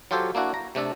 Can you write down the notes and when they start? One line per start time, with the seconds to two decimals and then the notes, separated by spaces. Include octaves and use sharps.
0.11 F#3 F4 G4 A4 C5 C#5
0.35 A#3 D4 E4 F#4
0.54 A#5
0.75 C3 A3 D4 A4